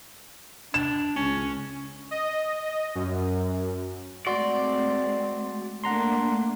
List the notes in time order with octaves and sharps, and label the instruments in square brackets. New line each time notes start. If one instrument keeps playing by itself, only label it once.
[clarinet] D4 [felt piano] E7
[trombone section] C#2 [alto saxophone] C#4
[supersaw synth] D#5
F#2
[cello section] G#3 A3 C4 [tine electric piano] F#4 C6 [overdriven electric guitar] D5
[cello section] A3 A#3 D4 [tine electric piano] F#5 A#5 C6